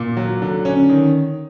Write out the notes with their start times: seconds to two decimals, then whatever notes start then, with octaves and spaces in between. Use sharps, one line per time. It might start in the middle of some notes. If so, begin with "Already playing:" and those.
Already playing: A#2
0.17 F#3
0.42 D3
0.65 C#4
0.90 D#3